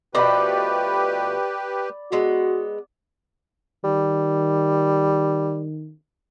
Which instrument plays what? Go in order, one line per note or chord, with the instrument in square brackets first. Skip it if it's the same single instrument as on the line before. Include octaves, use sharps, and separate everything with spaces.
[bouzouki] B2 F3 A3 [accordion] G4 B4 [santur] D5 B5
[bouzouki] G#3 B3 A4 [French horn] F#4
[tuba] D#3 [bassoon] G3